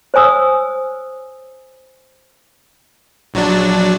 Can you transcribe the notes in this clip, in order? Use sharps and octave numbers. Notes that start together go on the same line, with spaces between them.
C5 C#5 G#5 D#6 E6
A#1 F#3 D4